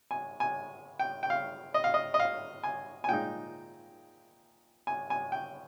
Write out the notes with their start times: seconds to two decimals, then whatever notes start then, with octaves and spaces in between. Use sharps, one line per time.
0.11 G#5
0.40 G#5
0.99 G5
1.23 G5
1.30 F5
1.74 D#5
1.84 F5
1.94 D#5
2.14 D#5
2.20 F5
2.64 G#5
3.04 G#5
3.09 A#2 G#3 D#4 G5
4.87 G#5
5.10 G#5
5.32 G5